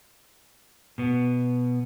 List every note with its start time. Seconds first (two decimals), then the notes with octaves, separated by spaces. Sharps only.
0.98 B2 B3